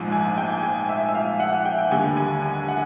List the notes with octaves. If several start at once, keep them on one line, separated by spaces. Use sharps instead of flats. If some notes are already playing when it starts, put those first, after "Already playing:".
Already playing: A#1 G#2 F3
G#5
G5
G#5
G#5
E5
E5
F5
F#5
F#5
G5
G5
D#2 D3 G3 G#5
G#5
G#5
F#5